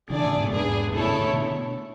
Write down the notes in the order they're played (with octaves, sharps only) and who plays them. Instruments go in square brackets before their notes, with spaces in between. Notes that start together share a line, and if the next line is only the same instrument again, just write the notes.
[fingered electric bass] C#3 E3 [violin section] A3 D4 G#4 D5
[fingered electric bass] A2 C#3
G#2 B2
[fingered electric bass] E2 G#2 [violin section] D4 G#4 B4
[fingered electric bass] G#2 B2 [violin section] A3 E4 A4 C#5
[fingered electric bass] A2 C#3
B2 D3
B2 D3